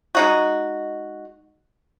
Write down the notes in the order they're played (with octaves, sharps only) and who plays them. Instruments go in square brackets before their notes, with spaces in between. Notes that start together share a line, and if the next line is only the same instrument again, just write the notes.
[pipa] G#3 D#4 F#4